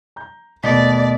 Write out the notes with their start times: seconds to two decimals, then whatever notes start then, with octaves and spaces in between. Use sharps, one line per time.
0.16 A#5 G6
0.64 D#2 B2 A3 D5 D#5 B6